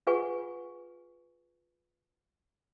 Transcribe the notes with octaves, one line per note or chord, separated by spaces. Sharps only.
F4 G#4 B4 F#5 G#5 C#6